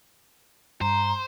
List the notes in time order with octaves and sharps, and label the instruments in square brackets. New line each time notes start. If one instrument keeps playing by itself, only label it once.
[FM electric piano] G2 [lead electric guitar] C5 [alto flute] A#5